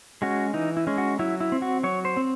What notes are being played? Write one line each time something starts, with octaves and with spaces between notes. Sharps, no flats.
G#3 C#4 F#4
E3 D#4
E4
G#3 C#4
F#4
F#3 E4
E4
C4
F#4
F#3 C#5
C5
C4